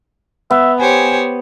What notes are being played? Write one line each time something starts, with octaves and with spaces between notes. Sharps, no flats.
B3 E5
G4 C5 C#5 G#5